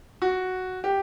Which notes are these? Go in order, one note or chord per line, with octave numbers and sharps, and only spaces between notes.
F#4
G4